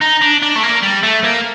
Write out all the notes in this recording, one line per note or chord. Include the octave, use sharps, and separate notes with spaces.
D#4
D4
D4
A3
A#3
G3
A3
A#3